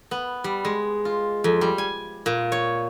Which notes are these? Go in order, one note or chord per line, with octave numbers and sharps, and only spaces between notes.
B3
G3
G#3
F4
F2
G3
G#5
A#2
C#5